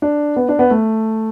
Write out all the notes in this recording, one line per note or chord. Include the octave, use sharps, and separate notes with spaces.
D4
B3
D4
B3
A3